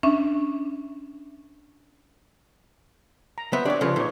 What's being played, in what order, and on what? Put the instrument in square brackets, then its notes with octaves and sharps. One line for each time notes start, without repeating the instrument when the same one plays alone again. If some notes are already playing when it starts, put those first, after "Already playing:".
[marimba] C#4 D4 E5
[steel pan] A#5
[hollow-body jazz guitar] B3 [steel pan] C5 E5
[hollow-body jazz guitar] D4 D5 [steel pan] G4 C#5
[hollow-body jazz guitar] C#3 F3 [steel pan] A4 B4
[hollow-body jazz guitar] A#2 [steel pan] D#4 B4 C#5